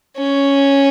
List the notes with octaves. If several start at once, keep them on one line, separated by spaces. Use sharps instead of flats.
C#4